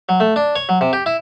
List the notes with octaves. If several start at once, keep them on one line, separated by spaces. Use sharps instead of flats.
F#3
A3
D4
C#5
F#3
C3
G4
E4